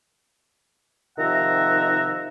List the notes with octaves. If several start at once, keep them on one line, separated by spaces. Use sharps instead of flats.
C3 D#3 F3 E5 F#5 A#5